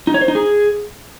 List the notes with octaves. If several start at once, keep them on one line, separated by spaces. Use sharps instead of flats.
D#4
C#5
C5
D#4
G#4